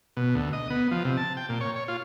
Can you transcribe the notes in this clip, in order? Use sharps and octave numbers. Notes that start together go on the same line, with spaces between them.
B2
D2
D#5
B3
F3
C3
A5
G5
A#2
C#5
C#5
F4